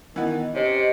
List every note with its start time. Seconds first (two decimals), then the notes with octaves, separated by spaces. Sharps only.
0.16 D#3 E3 B3
0.55 C3 C#4 D#5